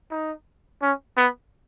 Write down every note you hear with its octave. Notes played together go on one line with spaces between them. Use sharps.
D#4
C#4
B3